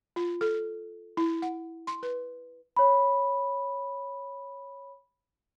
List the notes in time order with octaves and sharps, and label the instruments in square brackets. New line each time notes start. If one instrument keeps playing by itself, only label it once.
[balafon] F4
A4
E4
F#5
C6
B4
[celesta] C#5 B5